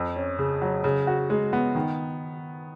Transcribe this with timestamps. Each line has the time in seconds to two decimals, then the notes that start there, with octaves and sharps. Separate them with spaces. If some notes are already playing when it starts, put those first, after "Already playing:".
Already playing: F2
0.16 C#4
0.39 C#3
0.62 F#3
0.84 C#3
1.07 F#4
1.30 G#3
1.53 B3
1.75 D#3